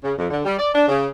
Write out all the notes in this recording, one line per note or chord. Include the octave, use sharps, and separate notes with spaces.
C#3
F2
D3
G3
D5
D4
C#3